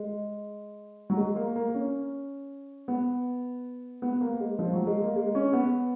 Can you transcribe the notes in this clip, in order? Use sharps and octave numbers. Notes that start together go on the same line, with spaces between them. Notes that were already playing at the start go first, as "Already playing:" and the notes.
Already playing: G#3
F#3
G#3
A#3
A#3
C#4
B3
B3
A#3
G#3
F3
F#3
G#3
A#3
G#3
C#4
B3